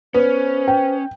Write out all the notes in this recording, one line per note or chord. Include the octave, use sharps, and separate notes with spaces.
B3 C#4 C5
G5